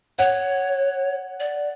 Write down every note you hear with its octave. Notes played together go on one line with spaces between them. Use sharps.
C#5 F#5
D5